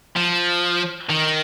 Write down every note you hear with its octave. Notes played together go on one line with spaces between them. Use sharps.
F3
D#3